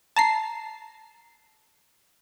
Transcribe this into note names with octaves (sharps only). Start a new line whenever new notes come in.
A5 A#5 C7